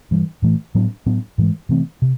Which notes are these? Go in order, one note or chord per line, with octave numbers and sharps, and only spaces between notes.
G2 E3 G3
A2 E3 A3
A2 F#3 B3 D4
A2 F#3 B3 D4
G#2 E3 G#3
C3 E3 A3 C4
C3